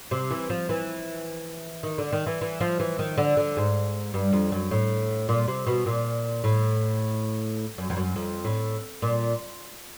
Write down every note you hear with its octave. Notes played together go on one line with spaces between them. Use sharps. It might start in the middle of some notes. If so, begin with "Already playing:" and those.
C3
E3
F3
E3
D#3
D3
D#3
E3
E3
F3
E3
D#3
D3
D3
G#2
G2
F2
F#2
A2
A#2
C3
B2
A#2
A2
F#2
F2
F#2
F2
A2
A#2